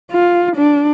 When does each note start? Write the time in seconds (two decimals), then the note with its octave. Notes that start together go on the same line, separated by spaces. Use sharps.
0.11 F4
0.57 D4